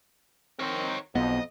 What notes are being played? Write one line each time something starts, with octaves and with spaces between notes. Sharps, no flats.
D#3 C4 A#4 C#5
B1 F2 B3 D#5